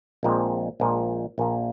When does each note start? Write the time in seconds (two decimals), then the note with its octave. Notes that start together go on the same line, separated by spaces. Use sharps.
0.23 A#1 A#2 F3 G#3 C4
0.80 A#1 A#2 F3 G#3
1.38 A#1 A#2 A#3